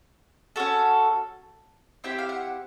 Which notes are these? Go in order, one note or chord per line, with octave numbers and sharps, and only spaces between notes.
C#4 F#4 A4
C4 E4 G4 G5
F5
F#5